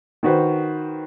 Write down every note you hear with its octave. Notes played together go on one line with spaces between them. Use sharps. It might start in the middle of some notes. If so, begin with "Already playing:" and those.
D#3 F#4 B4 C5